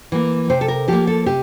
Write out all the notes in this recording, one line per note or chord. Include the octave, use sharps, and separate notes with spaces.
E3 A#3
C3 C5
A4
A#4
F3 A#3 G4
A4
C3 G4